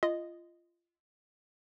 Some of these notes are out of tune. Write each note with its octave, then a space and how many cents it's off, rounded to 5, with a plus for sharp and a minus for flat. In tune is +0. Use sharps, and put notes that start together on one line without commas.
F4 -20 D#5 +0